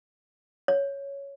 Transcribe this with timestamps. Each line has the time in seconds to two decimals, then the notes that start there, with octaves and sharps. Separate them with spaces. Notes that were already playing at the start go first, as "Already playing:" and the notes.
0.68 C#5